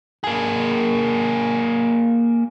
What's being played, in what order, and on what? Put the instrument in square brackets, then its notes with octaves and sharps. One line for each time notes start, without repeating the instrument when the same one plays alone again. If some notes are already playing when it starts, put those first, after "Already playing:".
[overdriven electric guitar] A#3 G#4